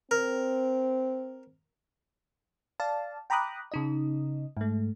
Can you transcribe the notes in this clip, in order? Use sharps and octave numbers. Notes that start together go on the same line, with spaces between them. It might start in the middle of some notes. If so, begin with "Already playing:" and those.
C4 A#4
D5 F5 A5
G5 A#5 B5 D6 D#6 F#6
C#3 D#4 D#5
G#2 A3